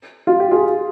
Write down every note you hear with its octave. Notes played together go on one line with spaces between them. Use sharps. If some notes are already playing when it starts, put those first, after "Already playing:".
F4
G4
F4 G#4